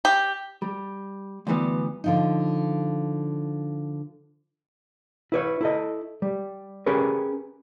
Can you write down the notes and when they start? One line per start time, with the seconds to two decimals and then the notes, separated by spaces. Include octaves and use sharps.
0.05 G4
0.62 G3
1.47 D2 G2 E3 G3 B3
2.04 D3 F3 D#4
5.32 E4 B4 C#5
5.61 E4 A4 D#5
6.22 G3
6.86 C#4 G4 G#4 A#4 B4